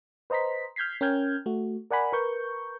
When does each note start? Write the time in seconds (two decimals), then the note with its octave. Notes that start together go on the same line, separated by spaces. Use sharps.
0.30 B4 C5 D#5 A#5 C6 B6
0.76 F6 G6 G#6 B6 C7
1.01 C#4 A#4 G5 F6 G6 G#6
1.46 A3 F#4
1.91 A#4 D5 F#5 G#5 B5
2.13 A#4 B4 C#6 G6